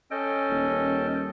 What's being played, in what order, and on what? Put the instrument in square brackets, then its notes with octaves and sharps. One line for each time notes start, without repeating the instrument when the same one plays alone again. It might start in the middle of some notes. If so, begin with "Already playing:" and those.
[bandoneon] C#4 D#5 [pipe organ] A4 G5
[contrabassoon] D#1